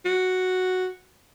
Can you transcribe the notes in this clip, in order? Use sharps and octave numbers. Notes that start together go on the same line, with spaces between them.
F#4